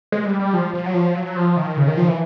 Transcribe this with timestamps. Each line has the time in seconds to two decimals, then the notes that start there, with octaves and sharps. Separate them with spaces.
0.12 G#3
0.25 G3
0.39 G3
0.54 F3
0.74 F3
0.86 F#3
0.94 F3
1.15 F#3
1.36 F3
1.57 D#3
1.77 C#3
1.88 D#3
1.97 F3
2.08 E3